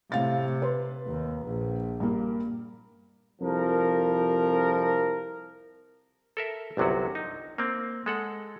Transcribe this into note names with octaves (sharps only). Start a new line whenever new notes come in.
A2 C3 F5 A6
B4 C6
D#2
A#1
G2 A#3
C2 F2 F3 A#4
A4 A#4 E5
G1 C2 C3 F#3 F#4
D#4
A#3 C4
G#3 A4 F#5